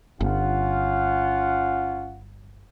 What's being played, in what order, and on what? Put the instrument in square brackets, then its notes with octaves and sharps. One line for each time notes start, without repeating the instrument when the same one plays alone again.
[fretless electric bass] G1 [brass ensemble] C#4 F4 F#5